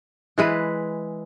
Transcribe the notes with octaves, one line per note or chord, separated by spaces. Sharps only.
E3 G#3 B4